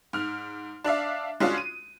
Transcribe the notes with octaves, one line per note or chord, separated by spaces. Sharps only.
G#2 F6
D4 D5 E5 F5
G#3 C#4 D4 F4 F#4
D#7